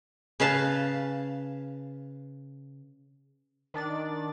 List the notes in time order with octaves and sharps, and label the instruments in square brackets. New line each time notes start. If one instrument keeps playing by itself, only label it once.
[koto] C#3 B4 F5 A5
[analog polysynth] D#3 D4 D5 A6